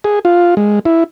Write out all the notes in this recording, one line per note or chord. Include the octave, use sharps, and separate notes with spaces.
G#4
F4
G#3
E4